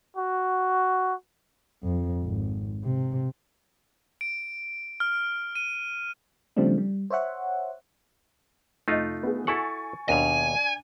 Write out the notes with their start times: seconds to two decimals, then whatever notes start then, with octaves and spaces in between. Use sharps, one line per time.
0.18 F#4
1.84 F2
2.22 G#1
2.84 C3
4.21 D7
5.00 F6
5.55 D#7
6.57 C#3 F3 G3 A3 C4 D4
6.78 G3
7.10 C5 C#5 E5 F#5
8.88 F1 A3 D#4 F4 D#5
9.23 B3 G#4
9.47 E4 A4 F#5 G#5 C#6 A6
10.09 D#2 B2 D4 G#5 D#7 F7